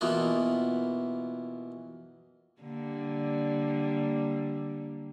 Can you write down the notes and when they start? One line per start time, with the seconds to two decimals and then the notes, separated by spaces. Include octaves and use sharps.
0.01 B2 E3 A#3 B3 F4
2.61 D3 G3 A#3